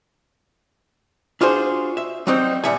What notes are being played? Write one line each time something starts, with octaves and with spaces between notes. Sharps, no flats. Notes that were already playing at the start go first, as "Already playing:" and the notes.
D4 F4 F#4 G#4 C5
E5
F#3 G3 C4 D#4 C5
A#2 G3 E5 F#5 G#5